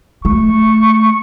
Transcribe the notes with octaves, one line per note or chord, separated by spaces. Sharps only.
A3 C#6